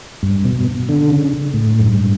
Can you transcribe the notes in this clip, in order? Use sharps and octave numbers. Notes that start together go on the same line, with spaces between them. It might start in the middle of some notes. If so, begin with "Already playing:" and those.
G2
B2
D3
C#3
A2
F#2
G2